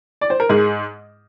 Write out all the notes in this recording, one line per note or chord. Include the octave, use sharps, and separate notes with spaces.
D5
C5
A#4
G#2 G#4